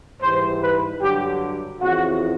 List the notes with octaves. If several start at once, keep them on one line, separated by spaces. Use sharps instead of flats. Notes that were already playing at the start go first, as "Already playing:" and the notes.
G#2 E3 G3 C5
B4
G2 D3 F#3 G4
F2 C#3 E3 F#4